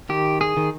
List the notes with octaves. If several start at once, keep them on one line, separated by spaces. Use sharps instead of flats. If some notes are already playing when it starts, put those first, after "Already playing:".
D#3 G4
G#4
D#3